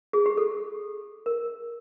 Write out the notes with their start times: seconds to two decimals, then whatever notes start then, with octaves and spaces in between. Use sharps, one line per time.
0.13 G#4
0.26 G4
0.38 A4
1.26 A#4